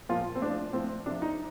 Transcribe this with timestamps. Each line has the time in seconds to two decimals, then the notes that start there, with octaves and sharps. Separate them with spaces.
0.09 A#2 F3 F4
0.35 C4
0.41 A2 F3 D4
0.73 A2 F3 C4
1.06 C3 D4
1.10 F3
1.22 D#4